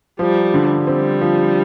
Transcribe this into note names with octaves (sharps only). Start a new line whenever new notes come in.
F3 G3
D3
G3 C4
F3